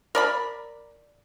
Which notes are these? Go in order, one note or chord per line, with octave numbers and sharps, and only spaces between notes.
A#4 D5 B5